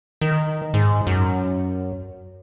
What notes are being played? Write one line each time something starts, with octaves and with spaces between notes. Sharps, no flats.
D#3
G#2
F#2